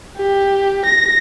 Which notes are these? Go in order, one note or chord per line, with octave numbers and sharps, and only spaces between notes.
G4
A#6